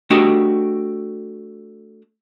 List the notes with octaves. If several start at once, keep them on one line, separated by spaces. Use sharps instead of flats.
A3 D4 F#4 G4 D#5